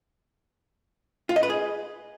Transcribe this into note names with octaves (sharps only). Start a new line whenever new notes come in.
F4
D#5
B4
G#4